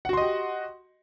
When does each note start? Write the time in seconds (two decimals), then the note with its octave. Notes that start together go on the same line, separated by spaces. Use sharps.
0.05 F#5
0.09 F#4
0.13 C6
0.17 D#5
0.22 G4